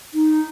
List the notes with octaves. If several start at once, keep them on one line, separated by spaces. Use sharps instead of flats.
D#4